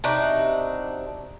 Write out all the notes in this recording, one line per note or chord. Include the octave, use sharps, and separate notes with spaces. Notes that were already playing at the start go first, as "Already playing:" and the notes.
C3 D4 D#4 F#4